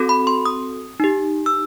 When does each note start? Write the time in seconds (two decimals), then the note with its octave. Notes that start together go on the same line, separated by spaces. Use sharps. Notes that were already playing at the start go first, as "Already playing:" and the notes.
Already playing: C4 F#4 A4
0.09 B5
0.27 C6
0.45 D#6
1.00 D#4 G4
1.46 E6